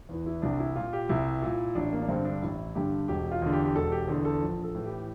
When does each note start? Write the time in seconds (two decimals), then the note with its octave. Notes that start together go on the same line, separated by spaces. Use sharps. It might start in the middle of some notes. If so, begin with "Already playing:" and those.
0.09 E2 E3
0.26 E4
0.42 C2 D4
0.59 E4
0.75 A#2 F4
0.93 G4
1.09 C2 E4
1.42 A#2
1.75 A1 D4
1.92 A#3
2.01 D4
2.08 G2 D3 C4
2.25 D4
2.42 A1 E4
2.75 G2 D3 G4
3.08 E1 G4
3.31 F4
3.42 E2 D3
3.53 G4
3.65 G4
3.75 E1 A4
3.92 G4
4.08 E2 D3 A4
4.25 A4
4.41 A#1
4.64 A4
4.75 A2 E3
4.85 G4